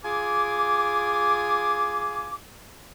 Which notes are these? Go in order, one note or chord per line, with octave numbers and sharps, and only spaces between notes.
F4 G#4 G#5 D6